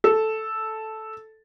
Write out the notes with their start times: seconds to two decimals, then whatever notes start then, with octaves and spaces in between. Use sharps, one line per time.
0.04 A4